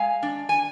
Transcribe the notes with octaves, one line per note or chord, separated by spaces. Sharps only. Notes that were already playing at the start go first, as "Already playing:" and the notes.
Already playing: G#3 F5 G#5
D4
G#5